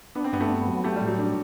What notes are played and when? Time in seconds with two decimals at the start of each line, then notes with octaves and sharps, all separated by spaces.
0.15 B3 D4
0.24 C4
0.32 G2 B3
0.41 A3
0.50 B3
0.67 F#3
0.84 A3 G4
0.96 G3
1.01 A2
1.07 F#3
1.18 G3 D4